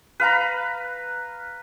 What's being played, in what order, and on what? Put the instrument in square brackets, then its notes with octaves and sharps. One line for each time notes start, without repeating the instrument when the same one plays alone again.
[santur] B4 F5 A#5 B5